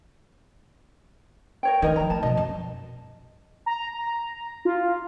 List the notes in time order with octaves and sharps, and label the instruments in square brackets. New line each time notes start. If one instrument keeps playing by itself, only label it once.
[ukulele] A#4 C#5 G5
[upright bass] D2 D#3 [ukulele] D#4 A#4 D#5
[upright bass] D#3 F3 [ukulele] A#5
[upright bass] A3 [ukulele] A5
[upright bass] B2 F3 [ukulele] D#5
[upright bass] F#2
[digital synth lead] A#5
A#5
F4